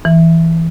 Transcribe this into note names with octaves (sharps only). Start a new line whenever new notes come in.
E3